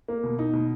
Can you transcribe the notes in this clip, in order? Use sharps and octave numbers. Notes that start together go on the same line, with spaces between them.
A#3
B2
D#4
B2